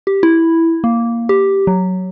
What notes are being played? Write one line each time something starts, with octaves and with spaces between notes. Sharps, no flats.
G4
E4
A#3
G4
F#3